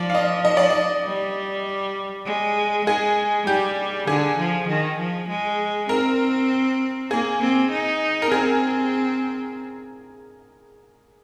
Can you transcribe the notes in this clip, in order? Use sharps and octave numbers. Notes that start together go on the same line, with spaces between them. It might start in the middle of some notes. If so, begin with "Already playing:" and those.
Already playing: F3 D5
F5
D#5
D#5
D5
D#5
G3
G#3
G#3 G#4
G3 G4
D3 G#4
F3
D#3
F3
G#3
C4 A#4
A#3 G#4
C4
D#4
A#4
C4 G#4